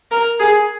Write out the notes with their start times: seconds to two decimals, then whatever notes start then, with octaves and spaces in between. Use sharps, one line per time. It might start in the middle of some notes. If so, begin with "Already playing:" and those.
0.11 A#4
0.40 G#4